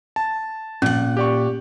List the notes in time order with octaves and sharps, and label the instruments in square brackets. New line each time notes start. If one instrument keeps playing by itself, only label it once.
[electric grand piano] A5
[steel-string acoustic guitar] A#2 F#5 [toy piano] C#4
[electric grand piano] G4 D5 C#6